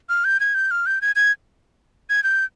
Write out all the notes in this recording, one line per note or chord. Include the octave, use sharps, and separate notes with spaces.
F6
G6
G#6
G6
F6
G6
G#6
G#6
G#6
G6